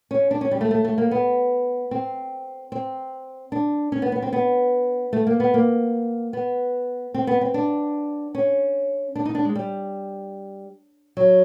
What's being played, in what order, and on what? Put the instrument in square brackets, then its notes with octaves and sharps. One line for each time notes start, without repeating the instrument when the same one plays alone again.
[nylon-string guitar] C#4
D4
C#4
G3
A3
A3
A3
A#3
B3
C4
C4
D4
C#4
B3
B3
C4
B3
A3
A#3
B3
A#3
B3
C4
B3
C4
D4
C#4
D4
D#4
D4
G#3
G3
F#3